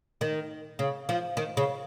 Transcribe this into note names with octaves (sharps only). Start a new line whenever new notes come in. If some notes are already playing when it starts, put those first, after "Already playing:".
D#3
C#3
F3
D#3
C#3